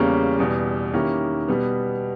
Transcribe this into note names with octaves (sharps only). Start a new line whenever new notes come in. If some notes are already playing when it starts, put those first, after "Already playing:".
Already playing: E2 C#3 G3 A#3 C#4
E2 B2 G3
D#3 A#3 C#4 E4 G4
B2 G3 B3